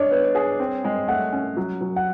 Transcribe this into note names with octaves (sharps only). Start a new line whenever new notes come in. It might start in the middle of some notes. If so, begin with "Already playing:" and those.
Already playing: D4 C#5 D#5
B3
G#4
C4
G#3
A3 F#5
C#4
F#3
F#3
F#5